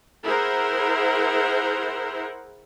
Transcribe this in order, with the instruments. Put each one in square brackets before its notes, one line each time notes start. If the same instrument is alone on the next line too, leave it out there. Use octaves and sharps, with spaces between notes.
[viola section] E4 G#4 A#4 C5 F#5